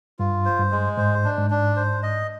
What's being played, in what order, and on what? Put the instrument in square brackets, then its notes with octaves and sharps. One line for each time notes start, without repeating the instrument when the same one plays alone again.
[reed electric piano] G2 [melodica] F4
[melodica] C5
[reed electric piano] G2
[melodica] G#3
[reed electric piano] G#2 [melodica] C5
[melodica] D4
[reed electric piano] G#2
[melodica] D4
C5
D#5